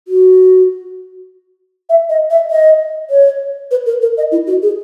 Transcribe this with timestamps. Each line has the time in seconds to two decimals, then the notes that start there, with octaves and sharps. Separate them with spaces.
0.08 F#4
1.90 E5
2.10 D#5
2.30 E5
2.51 D#5
3.10 C#5
3.71 B4
3.86 A#4
4.02 A#4
4.17 D#5
4.32 E4
4.47 F#4
4.63 G#4